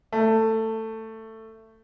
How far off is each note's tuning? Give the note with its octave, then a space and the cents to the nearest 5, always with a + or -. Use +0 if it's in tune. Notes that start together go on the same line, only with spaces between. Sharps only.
A3 +15